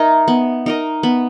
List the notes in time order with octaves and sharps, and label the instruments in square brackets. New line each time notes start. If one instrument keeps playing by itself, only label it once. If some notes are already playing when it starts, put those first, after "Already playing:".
Already playing: [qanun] D#4 A#4 D#5 [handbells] E5
[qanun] B3
D#4 A#4 D#5
B3